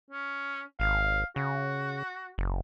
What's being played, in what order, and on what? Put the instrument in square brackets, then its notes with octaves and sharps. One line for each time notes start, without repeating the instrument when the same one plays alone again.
[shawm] C#4
[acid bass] G#1 [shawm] F5
[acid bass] C#3 [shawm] F#4
[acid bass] F#1